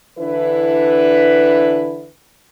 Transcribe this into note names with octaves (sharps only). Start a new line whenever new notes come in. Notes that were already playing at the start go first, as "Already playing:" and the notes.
D3 E3 D4 E4 B4